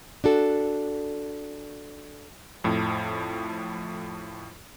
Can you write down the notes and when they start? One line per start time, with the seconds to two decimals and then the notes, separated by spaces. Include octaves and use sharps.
0.24 D4 F#4 A4
2.64 F2 A2 F3